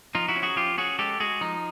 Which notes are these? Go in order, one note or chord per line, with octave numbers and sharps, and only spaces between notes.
F3 D#4 F4
E4 F#4
C#4
F#4 G#4
F3 F4 G4
C#4 F#4 G#4
G#3 G4 A4
G#3 F#4 G#4
F3 D#4